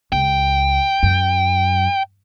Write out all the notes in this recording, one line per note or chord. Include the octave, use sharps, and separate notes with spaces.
C#2 G5
F#2